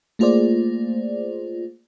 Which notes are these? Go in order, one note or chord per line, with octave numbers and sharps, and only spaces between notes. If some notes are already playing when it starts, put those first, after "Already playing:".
A3 A#3 F4 G#4 C5 D5